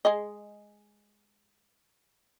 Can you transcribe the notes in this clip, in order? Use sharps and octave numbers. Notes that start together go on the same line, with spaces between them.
G#3 G#4 D#5